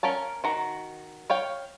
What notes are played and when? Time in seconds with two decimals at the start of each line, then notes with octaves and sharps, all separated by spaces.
0.03 C#4 A#4 F5 A5
0.44 D#3 F#4 A#5
1.30 C#5 F5 G5